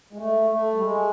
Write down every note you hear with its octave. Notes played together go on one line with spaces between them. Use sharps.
G#3
A3
A3
G3
G#3